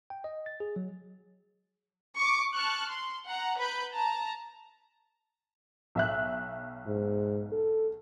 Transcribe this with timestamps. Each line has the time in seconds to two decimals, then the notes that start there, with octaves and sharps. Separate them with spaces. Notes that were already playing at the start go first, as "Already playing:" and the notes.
0.10 G5
0.24 D#5
0.46 A6
0.60 G#4
0.76 F#3
2.17 C#6 D6
2.54 A5 C#6 F6 F#6
2.90 C6
3.27 F#5 A#5
3.58 B4 B5 G6
3.95 A5 A#5
5.95 B1 E5 F#6
6.86 G#2
7.52 A4